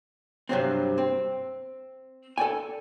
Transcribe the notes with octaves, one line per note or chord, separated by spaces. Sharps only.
G2 C3 F#3 C4
C4
A4 D5 G5 G#5